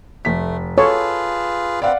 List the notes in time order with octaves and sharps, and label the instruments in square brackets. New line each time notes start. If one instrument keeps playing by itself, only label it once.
[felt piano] F1 B6 [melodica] A3
[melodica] F4 G#4 B4 [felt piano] A4 [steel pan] C#5
[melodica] C4 B4 [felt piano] D5 F5 F#5